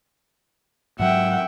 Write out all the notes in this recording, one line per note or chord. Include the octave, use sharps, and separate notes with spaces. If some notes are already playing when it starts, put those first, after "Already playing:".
G#2 F#3 E5 F#5 G5